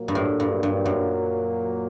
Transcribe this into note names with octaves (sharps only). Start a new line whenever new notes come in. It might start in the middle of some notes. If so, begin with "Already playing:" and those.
Already playing: A#2 F#3 A#3
G2
A2
G2
G2
F#2